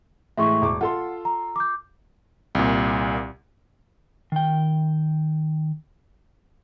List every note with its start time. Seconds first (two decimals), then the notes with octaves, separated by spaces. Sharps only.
0.38 A2 E3 G#3 E5 C6 C#6
0.62 E1 D6
0.81 F4 A4 F#5 C6
1.25 A#5
1.56 D6 G6
2.55 C2 A#2
4.32 D#3 G5